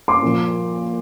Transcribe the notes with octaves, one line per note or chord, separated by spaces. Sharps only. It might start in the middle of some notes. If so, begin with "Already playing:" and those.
C6 D6
A#2 F3